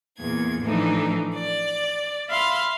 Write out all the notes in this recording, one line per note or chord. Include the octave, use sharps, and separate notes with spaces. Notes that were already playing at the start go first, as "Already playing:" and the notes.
E2 A#2 G#6
A2 E3 F3 A3 D4 D#4
D5
E5 F5 B5 C6